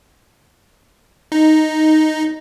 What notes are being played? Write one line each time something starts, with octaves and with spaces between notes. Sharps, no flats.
D#4